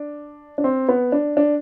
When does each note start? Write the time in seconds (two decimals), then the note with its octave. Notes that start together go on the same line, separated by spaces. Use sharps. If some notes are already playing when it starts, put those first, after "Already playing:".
Already playing: D4
0.58 D4
0.64 C4
0.89 B3
1.12 D4
1.37 D4